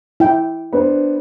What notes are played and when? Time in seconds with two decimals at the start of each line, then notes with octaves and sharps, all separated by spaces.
0.20 E4 G5
0.72 B3 D4 C5